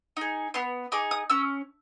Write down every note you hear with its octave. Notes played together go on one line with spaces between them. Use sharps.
D#4 G#4
B3 C6
D#4 G#4 D6
D#6
C#4 E6